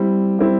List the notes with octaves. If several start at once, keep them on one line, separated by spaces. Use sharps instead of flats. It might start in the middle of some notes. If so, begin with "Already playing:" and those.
Already playing: G3 C4 E4
G3 C4 E4